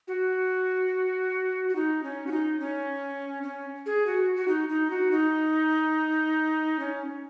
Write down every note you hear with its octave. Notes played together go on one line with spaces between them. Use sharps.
F#4
F#4
D#4
C#4
F#4
D#4
C#4
C#4
G#4
F#4
F#4
D#4
D#4
F#4
D#4
C#4